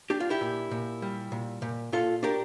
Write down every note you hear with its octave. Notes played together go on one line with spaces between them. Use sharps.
D4 G4
F4
E4 G4
A#2
A#2
G3
A#2
A#2
A#2 F4 A4
D4 G4 A#4